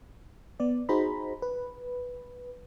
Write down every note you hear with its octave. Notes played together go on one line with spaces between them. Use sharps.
B3 D5
D#4 F#4 G#4 C5 A#5 B5
B4